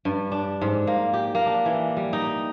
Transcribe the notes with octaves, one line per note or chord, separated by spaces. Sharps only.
G2
D4
G#2
A#3
G4
A#3
D4
E3
G3
D#4